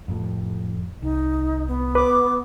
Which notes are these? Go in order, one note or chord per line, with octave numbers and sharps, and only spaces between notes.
F2 A2
C2 D#4
B3
B4 D6